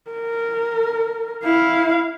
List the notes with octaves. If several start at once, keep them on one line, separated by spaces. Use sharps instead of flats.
A#4
E4 F5